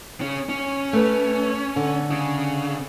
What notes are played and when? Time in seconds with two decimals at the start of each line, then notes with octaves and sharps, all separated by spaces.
0.21 C#3 C#4
0.49 C#4
0.93 A3 B4
1.76 D3
2.11 C#3